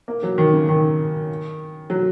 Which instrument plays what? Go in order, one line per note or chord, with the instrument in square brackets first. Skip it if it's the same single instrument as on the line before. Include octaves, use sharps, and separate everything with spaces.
[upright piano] A#3
F#3
D#3
C#3
D#3
F#3